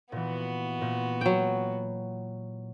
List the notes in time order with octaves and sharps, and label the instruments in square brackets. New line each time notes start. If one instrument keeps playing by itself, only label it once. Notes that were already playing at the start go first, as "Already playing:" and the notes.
[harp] A#2 E3 [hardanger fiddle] B3 F#4
[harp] A#2
[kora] F#3 G5